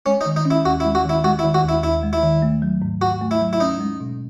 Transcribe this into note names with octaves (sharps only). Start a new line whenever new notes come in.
G#3 C#4
D#4
D#3
D#4
C#4
E4
D#2 F#4
E4
G#3
F#4
D#3 E4
G#3 F#4
E4
D#3
F#4
D#2 E4
D#2 E4
G#3
E4
D#3
A3
F#3
G#2
G#2 F#4
A3
E4
F#3
E4
C#4 D#4
G#3
B2